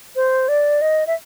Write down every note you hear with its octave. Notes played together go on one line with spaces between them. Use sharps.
C5
D5
D#5
E5